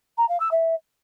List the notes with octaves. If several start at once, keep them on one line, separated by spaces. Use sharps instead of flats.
A#5
F5
E6
E5